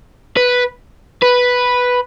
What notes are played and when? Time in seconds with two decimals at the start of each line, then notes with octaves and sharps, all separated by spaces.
0.37 B4
1.22 B4